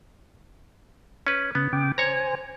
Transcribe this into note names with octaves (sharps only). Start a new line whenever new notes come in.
C#4 B4
C#3 B3
C#3 G5 D6
C5 C#5 G#5 A#5